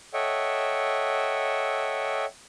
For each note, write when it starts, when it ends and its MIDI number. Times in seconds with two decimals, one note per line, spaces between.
0.14 2.25 69
0.14 2.25 73
0.14 2.25 75
0.14 2.25 76
0.14 2.25 78
0.14 2.25 79